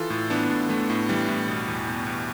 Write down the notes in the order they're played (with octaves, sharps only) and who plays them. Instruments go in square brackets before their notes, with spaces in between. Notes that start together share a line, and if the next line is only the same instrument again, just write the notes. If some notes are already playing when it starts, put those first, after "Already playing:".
Already playing: [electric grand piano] E3 F4 A4
A2
E3 B3 D4
A2
E3 A3
A2
E3 G3
A2
B2
E2
B2
E2